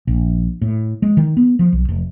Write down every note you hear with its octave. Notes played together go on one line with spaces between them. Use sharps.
A#1
A2
G#3
D#3
B3
F3
B1
F1